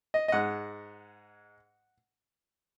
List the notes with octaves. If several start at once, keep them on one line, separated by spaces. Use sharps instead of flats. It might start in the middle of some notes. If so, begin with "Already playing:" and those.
D#5
D#5
G#2 G#3 F#5